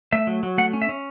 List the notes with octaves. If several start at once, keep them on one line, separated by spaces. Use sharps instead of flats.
A3 E5
F#3
F#3
A3 F#5
C#4
E5
C#4